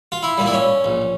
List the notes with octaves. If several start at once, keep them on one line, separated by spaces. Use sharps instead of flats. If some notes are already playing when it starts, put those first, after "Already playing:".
F4
E4
A#2 G3
E4
C#4
A#1